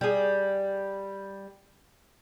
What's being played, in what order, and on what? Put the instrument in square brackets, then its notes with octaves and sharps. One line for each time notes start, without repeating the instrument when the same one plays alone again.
[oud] G3 G#4